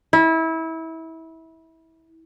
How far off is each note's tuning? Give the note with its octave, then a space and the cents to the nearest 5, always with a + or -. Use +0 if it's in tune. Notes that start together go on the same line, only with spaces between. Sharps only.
E4 -25